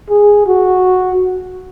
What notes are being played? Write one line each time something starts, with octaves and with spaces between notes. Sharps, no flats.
G#4
F#4